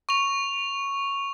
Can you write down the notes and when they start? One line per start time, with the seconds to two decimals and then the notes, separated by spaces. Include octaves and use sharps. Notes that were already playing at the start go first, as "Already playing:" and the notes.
0.09 C#6 F7